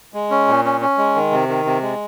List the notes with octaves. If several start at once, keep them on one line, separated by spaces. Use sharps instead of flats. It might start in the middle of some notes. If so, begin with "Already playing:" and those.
G#3
C#4
A#2
C#4
C#4
G#3
D#3
C3
D#3
C3
G#3